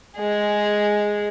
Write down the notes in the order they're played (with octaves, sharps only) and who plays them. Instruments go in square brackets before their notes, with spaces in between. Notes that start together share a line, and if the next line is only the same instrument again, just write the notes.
[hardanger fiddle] G#3 G#4